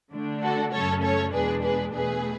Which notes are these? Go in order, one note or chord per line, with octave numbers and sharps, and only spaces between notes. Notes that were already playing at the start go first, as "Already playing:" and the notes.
D3 A3 D4
F#4 A4
F#2 C#3 F#3 A3 C#4 A4 C#5
A4 C#5
E2 B2 G#3 D4 G#4 B4
G#4 B4
E2 B2 A3 G#4 B4